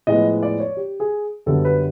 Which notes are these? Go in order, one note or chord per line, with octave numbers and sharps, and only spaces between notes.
A2 F3 G#3 B3 D#5
D5
C#5
G4
G#4
F#2 D3 G3 B3 A4
B4